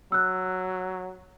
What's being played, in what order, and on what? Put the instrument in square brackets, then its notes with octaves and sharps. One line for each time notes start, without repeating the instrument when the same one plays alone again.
[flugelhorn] F#3 [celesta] E6 F#6